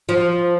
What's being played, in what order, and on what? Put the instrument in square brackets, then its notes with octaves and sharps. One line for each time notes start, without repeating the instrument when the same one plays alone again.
[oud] F3